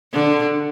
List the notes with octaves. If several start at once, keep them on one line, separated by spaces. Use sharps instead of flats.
D3